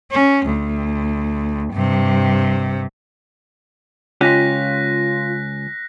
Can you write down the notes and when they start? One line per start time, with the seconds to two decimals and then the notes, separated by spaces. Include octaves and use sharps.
0.11 C#4
0.45 D2
1.73 G2 C3
4.21 C#2 C#4 F4 G4 F#6 A#6 B6